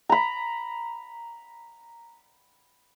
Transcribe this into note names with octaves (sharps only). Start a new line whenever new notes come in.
A#5 B5